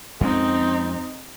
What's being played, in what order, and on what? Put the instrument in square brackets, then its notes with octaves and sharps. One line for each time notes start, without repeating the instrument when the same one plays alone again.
[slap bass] F2 G#3 C#4 [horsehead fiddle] C4 D#4